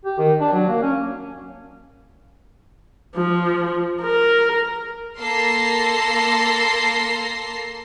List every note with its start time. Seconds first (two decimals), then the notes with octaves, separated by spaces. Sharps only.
0.05 G4
0.18 D#3
0.40 D4
0.52 F#3
0.68 A#3
0.82 C#4
3.15 F3
4.03 A#4
5.19 A#3 A4 C6 A#6 C7